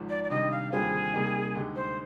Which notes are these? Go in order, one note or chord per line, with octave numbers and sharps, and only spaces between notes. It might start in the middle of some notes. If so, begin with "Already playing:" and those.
Already playing: G#1 G#2 F3
D5
D5
C3 D#3 G3 D4 D#5
F5
D#2 D3 G3 C4 F4 G#4
C3 G3 A#3 D#4
D2 D3 G#3 D#4 G4
C5